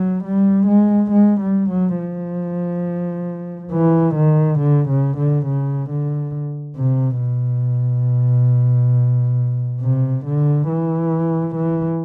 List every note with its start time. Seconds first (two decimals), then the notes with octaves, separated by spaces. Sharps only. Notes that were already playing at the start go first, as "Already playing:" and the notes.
Already playing: F#3
0.24 G3
0.67 G#3
1.11 G#3
1.40 G3
1.69 F#3
1.98 F3
3.72 E3
4.15 D#3
4.59 D3
4.88 C#3
5.18 D3
5.46 C#3
5.90 D3
6.76 C3
7.20 B2
9.81 C3
10.25 D3
10.68 E3
11.55 E3